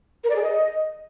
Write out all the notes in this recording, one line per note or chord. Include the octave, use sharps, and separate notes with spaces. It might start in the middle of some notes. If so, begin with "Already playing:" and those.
A#4
D5
G#4
D#5